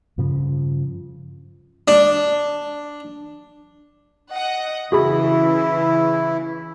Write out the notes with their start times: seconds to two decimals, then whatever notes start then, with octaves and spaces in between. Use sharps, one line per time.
0.18 G2 C#3 F3
1.88 D4
4.32 D#5 F#5
4.92 C#3 E3 E4 F#4 G#4 B5